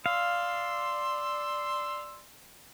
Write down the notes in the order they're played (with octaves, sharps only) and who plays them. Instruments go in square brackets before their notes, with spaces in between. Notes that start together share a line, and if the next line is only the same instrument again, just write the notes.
[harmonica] D5 C6 E6 [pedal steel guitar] F5